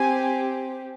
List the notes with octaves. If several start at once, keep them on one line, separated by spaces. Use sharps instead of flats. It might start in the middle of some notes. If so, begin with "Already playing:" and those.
Already playing: C4 G4 G#5